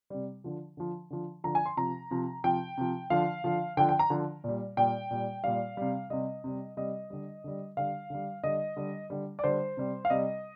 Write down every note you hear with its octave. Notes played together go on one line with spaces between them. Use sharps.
C3 G3
D3 F3
D3 F3
D3 F3
D3 F3 A#5
G#5
C6
C3 F3 A#5
C3 F3
C3 F3 G5
C3 F3
D3 F3 F5
D3 F3
D3 F3 G5
G5
A#5
D3 F3
A#2 G3
A#2 G3 G5
A#2 G3
A#2 G3 F5
C3 G3
C3 G3 D#5
C3 G3
C3 G3 D#5
D3 G3
D3 G3
D3 G3 F5
D3 G3
D3 G3 D#5
D3 G3
D3 G3
D5
D3 G3 C5
C3 G3
F5
C3 G3 D#5